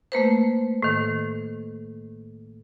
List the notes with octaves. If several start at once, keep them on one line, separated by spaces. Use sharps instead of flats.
A3 A#3 B4 C5
A2 D#3